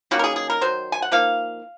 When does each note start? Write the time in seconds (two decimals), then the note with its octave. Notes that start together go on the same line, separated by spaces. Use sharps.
0.11 D#3 F#3 A#3 C#4 F#4
0.19 A#4
0.24 G#4
0.36 G#4
0.50 A#4
0.61 D#3 F#3 C5
0.92 G#5
1.02 F#5
1.12 F3 A#3 D#4 F5